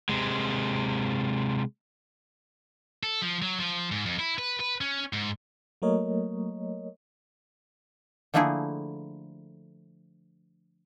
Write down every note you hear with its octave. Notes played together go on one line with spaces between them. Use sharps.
C3 G#3
A4
F3
F#3
F3
G#2
F2
E4
B4
B4
C#4
G#2
F#3 A3 A#3 A#4 C#5 D#5
D3 F3 A3 A#3 E4 G#4